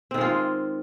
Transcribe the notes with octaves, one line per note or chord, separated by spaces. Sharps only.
D#3 G#3 C4 F4